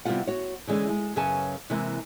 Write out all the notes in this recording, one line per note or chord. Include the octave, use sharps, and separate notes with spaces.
C3 G3 B3 E4 F4 F#5
F#4 C#5
D3 E3 G#3 C#4
G#3
F#2 C#3 C#4 B4 G#5 A5
C3 E3 G#3 A#3